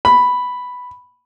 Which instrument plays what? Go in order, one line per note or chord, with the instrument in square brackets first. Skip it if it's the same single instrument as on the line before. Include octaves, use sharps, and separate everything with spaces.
[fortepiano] B5